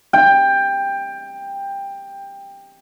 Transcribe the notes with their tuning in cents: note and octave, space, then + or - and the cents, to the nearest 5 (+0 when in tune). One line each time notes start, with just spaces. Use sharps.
G5 +15